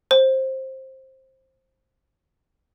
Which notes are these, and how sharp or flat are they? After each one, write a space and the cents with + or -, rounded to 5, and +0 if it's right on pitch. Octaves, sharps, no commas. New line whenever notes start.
C5 +15